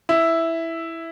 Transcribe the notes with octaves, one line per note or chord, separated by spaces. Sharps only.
E4